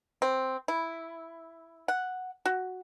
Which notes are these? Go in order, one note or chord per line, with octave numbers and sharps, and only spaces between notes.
C4
E4
F#5
F#4